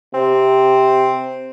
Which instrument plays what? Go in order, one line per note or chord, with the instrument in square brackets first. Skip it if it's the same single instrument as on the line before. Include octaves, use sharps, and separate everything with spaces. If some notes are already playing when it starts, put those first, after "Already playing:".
[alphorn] C3 [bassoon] C4